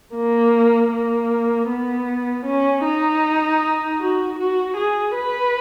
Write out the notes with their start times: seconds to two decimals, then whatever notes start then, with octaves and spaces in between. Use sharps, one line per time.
0.15 A#3
0.93 A#3
1.69 B3
2.46 C#4
2.85 D#4
3.99 F#4
4.38 F#4
4.76 G#4
5.15 B4